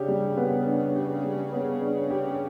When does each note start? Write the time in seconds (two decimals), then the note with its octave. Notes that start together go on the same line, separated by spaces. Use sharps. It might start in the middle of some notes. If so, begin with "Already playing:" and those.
Already playing: C#3 D4 G4
0.08 G3
0.37 B3
0.66 D4
0.95 G4
1.24 G3
1.52 B3
1.81 D4
2.10 G4